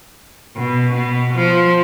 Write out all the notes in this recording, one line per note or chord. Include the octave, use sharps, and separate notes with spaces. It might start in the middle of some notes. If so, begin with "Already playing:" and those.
B2
B2
F3